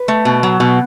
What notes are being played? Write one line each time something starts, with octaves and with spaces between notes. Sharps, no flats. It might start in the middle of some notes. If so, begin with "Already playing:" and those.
Already playing: B4
A3
B2
F#3
B2